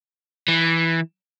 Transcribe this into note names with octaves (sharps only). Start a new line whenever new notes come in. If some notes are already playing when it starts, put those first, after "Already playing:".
E3